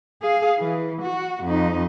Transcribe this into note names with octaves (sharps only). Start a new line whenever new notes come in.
G#4 F5
E3
F#4
F2 D#4